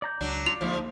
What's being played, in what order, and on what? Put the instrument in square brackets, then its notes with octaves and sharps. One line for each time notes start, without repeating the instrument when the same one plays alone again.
[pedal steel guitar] D5 A#5 G6
[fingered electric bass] C#2 [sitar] F#3 D4
[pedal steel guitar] F4 D5 [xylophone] F7
[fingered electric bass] D2 A#3 [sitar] G#2 F3